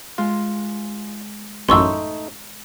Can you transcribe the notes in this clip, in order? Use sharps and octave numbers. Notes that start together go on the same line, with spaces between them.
G#3 F4
A1 F#2 A3 D#4 C6 C#6 E6